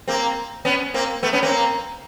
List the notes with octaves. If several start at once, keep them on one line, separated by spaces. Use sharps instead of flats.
A#3 C4
B3 C#4
A#3 C4
A3 B3
B3 C#4
A#3 C4